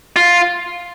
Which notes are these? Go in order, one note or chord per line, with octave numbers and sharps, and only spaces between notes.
F4